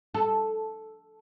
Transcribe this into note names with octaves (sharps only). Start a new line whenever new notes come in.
A4